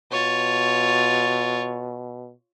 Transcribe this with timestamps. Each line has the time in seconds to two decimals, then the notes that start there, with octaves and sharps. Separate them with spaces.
0.12 B2 F4 C#5